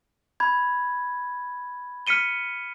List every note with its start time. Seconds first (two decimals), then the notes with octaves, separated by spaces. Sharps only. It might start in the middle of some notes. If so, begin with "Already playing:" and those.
0.40 B5 G#6
2.07 F6 B6 C#7 D#7 G7